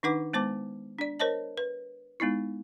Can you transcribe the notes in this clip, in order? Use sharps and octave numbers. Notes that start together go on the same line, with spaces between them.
D#3 D4 D#4 B4 F#5 D6
G#3 B3 C5 A5 D6
D4 D5
A#4 C5 C#5 D#5 A5
B4
G#3 B3 D#4 E4